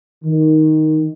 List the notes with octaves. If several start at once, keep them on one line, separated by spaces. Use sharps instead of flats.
D#3